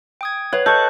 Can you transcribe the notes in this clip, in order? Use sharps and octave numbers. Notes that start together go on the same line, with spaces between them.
G5 D#6 G#6
B4 C#5 F#5
A4 D#5 C#6 G6